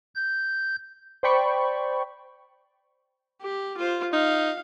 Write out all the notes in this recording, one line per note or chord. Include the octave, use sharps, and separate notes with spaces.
G6
C5 D5 G5 B5 C#6
G4
F4 C5
D#4 F5